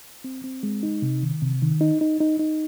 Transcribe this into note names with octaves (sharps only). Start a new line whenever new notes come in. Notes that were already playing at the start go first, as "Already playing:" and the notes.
C4
C4
G#3
D#4
C3
D#3
C3
D#3
D#4
D#4
D#4
D#4